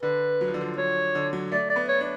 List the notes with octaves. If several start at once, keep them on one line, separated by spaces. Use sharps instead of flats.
D3 B4
F#3
F3
D3
F3
F#3 C#5
D3
F#3
A3 D5
D5
B3
C#5
D4